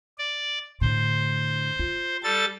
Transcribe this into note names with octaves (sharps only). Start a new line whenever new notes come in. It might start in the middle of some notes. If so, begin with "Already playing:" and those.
D5
A2 D3 C5
F4
G3 A4 A6